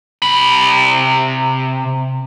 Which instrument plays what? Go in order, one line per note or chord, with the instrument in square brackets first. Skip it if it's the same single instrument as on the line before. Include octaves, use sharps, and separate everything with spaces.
[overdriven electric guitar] C3 B5